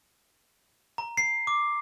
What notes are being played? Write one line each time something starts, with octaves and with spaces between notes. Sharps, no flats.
A#5
C7
D6